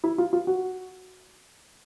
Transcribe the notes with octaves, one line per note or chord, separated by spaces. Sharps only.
E4
F4
F4
F#4